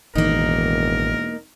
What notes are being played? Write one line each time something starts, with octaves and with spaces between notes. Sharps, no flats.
E1 A1 D#3 E3 A#3 D#4 A#4